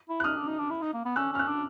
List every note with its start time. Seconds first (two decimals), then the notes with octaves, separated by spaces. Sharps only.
0.09 E4
0.20 F#6
0.24 D#4 D#6 F6
0.37 D4
0.47 D#4
0.59 D4
0.70 E4
0.81 D#4
0.94 A#3
1.05 B3
1.16 C#4 E6 F#6
1.32 C#4 F6
1.39 E6 F#6
1.48 D4